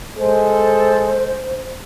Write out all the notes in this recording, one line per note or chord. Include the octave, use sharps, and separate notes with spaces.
G#3 A4 C5